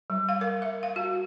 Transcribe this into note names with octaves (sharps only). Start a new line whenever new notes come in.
G3
F5
A#4
E5
F5
F#4